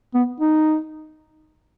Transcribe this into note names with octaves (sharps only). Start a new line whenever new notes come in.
B3
D#4